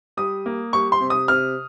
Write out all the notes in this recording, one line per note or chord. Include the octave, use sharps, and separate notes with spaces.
G3 D#6
A#3
G3 C#6
C6
C3
D#6
C3 F6